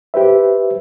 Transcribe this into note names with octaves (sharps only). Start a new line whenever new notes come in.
G4 B4 C5 E5